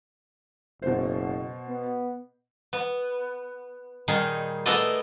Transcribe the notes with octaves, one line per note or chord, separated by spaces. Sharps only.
F#1 B2 C5
B3
B3
A#2 D#3 G3 D#4 G#4
G#3 A3 B3 E4 D5 D#5